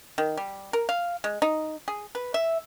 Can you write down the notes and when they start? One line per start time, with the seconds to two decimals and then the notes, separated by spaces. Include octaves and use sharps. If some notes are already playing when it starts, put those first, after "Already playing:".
0.18 D#3
0.37 G3
0.73 A#4
0.89 F5
1.24 G#3
1.42 D#4
1.88 G#4
2.15 B4
2.34 E5